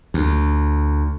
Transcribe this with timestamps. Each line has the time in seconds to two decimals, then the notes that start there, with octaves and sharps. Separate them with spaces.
0.14 D2